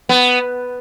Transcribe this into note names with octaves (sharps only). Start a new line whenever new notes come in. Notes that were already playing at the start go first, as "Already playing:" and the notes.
B3